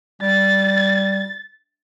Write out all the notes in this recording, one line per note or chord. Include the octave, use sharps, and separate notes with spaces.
G3 A6